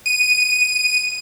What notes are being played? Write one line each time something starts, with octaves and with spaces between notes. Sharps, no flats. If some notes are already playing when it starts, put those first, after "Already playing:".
D#7